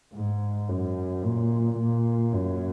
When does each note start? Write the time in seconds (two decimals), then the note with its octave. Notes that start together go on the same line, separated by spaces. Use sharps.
0.14 G#2
0.69 F#2
1.23 A#2
1.78 A#2
2.32 F#2